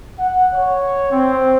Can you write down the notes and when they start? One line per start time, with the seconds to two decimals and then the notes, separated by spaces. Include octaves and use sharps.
0.19 F#5
0.54 C#5
1.12 C4